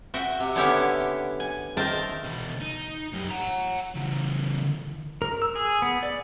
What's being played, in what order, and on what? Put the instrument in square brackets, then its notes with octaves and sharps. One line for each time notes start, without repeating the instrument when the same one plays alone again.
[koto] F#4 E5 F#5 G5
C3
D3 B3 C#4 E4 G4 C#5
G#5
D#3 A#4 C5 E5 G5 A5
[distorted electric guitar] B2 E3
D#4
F#2 G4
F#5 A#5
C#3 E3
[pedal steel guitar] A#4
E6
G#4
B3
D5